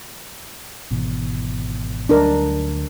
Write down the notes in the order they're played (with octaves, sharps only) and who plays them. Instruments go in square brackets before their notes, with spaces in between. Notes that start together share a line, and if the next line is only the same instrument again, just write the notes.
[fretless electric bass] G#1 B2 E3
[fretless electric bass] D2 F#3 [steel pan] D4 A#4